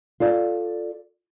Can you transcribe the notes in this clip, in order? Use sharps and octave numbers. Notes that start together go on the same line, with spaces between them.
F4 A4 D5